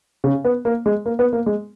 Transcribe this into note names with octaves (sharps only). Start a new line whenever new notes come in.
C#3
B3
A#3
G#3
A#3
B3
A#3
G#3